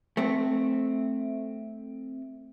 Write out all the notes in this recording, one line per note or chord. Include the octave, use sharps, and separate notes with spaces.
A3 C4